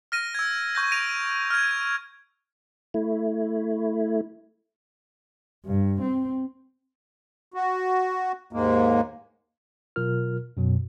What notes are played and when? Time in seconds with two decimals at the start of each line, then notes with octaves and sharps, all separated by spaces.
0.12 F6 A#6 D#7
0.35 E6 G#6
0.75 C#6 G6 A#6
0.91 A#6 D7 D#7 F7
1.50 F6 G#6
2.94 A3 E4
5.66 G2
6.01 C4
7.54 F#4
8.53 D#2 G#2 G#3 A#3
9.96 B2 F#3 F4 A#4 F6
10.57 F#2 B2 F#3